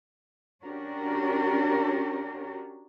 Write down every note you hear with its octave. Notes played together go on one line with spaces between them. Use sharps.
C#4 D4 F#4 G4 A#4